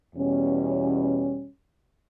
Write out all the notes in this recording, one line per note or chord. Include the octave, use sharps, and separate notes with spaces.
E2 B2 G3 C#4